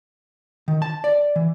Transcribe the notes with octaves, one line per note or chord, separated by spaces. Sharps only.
D#3
A5
D5
E3